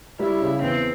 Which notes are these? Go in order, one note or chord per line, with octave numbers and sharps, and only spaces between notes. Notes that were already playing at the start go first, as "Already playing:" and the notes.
G3 E4
C#3
E2 C4